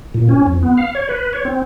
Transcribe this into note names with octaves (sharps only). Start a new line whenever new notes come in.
A#2
C#4
F2
B3
F5
C#5
B4
C#5
C4